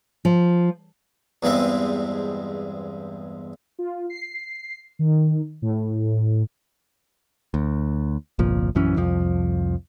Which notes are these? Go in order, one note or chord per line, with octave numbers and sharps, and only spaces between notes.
F3
E2 G2 G#3 C4 E5
F4
C7
D#3
A2
D2
G1 C2 A#2 F3
A#1 F#2 E3 C#4
C2 F2 F3